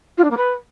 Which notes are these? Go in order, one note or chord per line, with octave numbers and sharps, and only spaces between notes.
F4
D4
A#3
B4